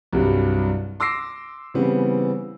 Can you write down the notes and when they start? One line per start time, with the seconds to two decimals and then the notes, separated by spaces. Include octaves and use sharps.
0.13 C2 G2 F#3
1.00 C6 D6 E6 A#6 C7
1.74 C#3 E3 G3 B3 C4